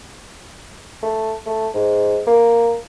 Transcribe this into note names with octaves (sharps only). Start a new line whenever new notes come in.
A3
A3
G#2
A#3